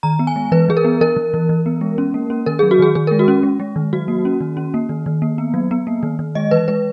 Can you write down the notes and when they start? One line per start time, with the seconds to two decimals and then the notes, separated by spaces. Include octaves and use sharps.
0.03 D#3 A#5
0.19 B3
0.27 G#5
0.36 G#3
0.52 E3 B4
0.69 E3 G#4
0.77 A#4
0.85 B3
1.01 E3 A#4
1.16 E3
1.34 E3
1.49 E3
1.66 B3
1.81 G#3
1.98 C#4
2.14 A#3
2.30 C#4
2.46 D#3 A#4
2.59 F#3 G#4
2.71 F#4
2.79 D#3 G#4
2.95 D#3 G#4
3.07 G#3 A#4
3.19 F#4
3.28 C#4
3.43 G#3
3.60 G#3
3.76 D#3
3.93 F#3 F#4
4.08 A#3
4.25 C#4
4.41 D#3
4.57 C#4
4.74 A#3
4.89 D#3
5.06 D#3
5.22 A#3
5.38 B3
5.54 F#3
5.71 B3
5.87 A#3
6.03 D#3
6.19 D#3
6.35 G#3 D#5
6.51 E3 B4
6.68 G#3 B4